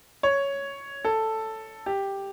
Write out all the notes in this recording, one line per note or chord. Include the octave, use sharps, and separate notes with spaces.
C#5
A4
G4